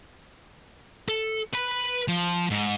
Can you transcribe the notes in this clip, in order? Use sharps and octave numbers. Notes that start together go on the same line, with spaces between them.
A4
B4 B5
F3
G#2